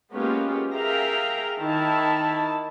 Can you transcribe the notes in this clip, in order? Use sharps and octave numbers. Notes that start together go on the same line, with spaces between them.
G#3 A#3 B3 C#4 F4 G4
G#4 A#4 E5 F5 G5 A#5
D#3 E4 A5